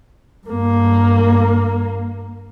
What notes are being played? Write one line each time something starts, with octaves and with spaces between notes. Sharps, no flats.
G2 A#3